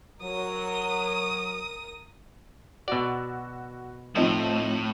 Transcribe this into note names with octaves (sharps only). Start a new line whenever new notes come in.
F#3 A#4 D#6
B2 F#4 D5 E6
A2 F3 C4 D#4